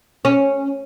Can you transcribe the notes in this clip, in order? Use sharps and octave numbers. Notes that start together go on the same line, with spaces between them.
C#4